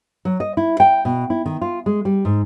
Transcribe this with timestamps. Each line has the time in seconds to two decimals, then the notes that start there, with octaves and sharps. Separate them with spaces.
0.25 F#3
0.40 D#5
0.57 E4
0.80 G5
1.05 B2
1.30 E4
1.46 D#3
1.62 F4
1.86 G#3
2.05 G3
2.25 G#2